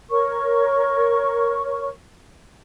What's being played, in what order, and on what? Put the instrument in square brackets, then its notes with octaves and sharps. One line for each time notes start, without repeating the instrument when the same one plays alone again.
[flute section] A#4 C#5 C#6